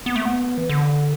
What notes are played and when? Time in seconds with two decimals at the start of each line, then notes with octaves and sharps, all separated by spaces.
0.06 B3
0.16 A3
0.25 B3
0.58 E3
0.69 D3